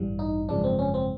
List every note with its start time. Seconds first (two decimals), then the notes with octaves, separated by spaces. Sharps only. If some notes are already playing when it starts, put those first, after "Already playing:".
Already playing: A1 G2 E3 G3
0.19 D#4
0.49 G#1 F#2 C#3 F3 G#3 D4
0.64 C4
0.79 C#4
0.94 C4